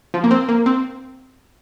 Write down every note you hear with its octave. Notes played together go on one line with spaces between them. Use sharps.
F3
A#3
C4
A#3
C4